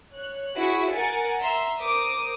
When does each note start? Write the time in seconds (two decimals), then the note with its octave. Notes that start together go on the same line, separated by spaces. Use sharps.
0.14 C#5 F#6
0.56 E4 F#4 G#4 C#6
0.93 A#4 F#5 G#5 A6 C#7
1.40 E5 A#5 C6 E6
1.80 A#4 C5 D6 D#6